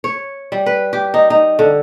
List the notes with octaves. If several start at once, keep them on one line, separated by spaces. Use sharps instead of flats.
C#5
G3
B4
G4
D#4
D#4
D3